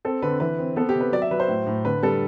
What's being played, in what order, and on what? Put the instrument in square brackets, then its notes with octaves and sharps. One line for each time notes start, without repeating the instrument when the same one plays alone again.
[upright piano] C4 A4
D3 B4
E3 B4
C4
B3 A4
G4
C3
B4
F#3 D5
E5
F#3 B4
C5
A2
A2
D3 B4
G3 A4